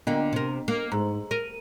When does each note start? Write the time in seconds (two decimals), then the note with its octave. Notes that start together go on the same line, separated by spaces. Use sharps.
0.07 D3 A#3 B3 D4 D#5
0.33 C3 A#4
0.68 A#3
0.92 G#2 G#4 A#5
1.31 A#4 D#7